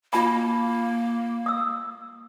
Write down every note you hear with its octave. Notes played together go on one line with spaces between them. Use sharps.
A#3 F4 A5 B5
D#6 E6